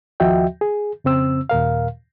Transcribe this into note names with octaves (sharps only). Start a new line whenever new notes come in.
D#2 F3 F#4 D#5 E5 G5
G#4
F2 C#3 C4 E6
D#2 A#2 A#4 F5